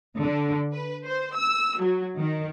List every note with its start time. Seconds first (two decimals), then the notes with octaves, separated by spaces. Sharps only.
0.21 D3
0.72 B4
1.05 C5
1.36 E6
1.80 F#3
2.18 D#3